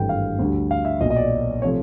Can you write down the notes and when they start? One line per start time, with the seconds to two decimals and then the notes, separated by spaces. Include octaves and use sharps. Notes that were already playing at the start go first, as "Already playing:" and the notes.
Already playing: G#1 G2 E3 A3 G5
0.09 F5
0.39 D2 D3 G3
0.71 F5
0.85 E5
1.00 B1 A#2 F#3 D#5
1.10 D#5
1.16 D5
1.62 C3 F3 A3 C#5